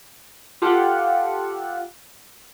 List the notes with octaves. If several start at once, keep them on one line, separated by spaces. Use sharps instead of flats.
F4 G4 A4 F#5